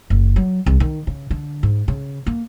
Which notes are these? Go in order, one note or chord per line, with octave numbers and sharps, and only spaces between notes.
F#1
F#3
C2
D#3
C#3
D3
G#2
C#3
A#3